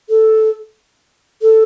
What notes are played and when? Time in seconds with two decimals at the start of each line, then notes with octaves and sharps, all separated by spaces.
0.09 A4
1.42 A4